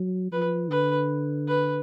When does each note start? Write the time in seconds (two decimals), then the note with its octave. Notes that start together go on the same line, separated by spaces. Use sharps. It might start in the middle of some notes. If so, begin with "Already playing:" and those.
Already playing: F#3
0.32 F3 B4
0.70 D3 B4
1.48 B4